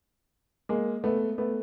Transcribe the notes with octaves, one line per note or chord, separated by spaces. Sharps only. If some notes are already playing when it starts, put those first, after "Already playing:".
G#3 A#3
A3 B3
A3 B3